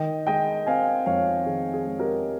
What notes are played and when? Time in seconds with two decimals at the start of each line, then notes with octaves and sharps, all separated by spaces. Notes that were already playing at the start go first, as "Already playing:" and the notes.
Already playing: D#3 D#5 G5
0.27 G#3 D#5 G5
0.66 C4 F5 G#5
1.06 F2 C#5 F5
1.46 D#3 G#4
1.74 G#4
1.86 G#3
1.99 G4 A#4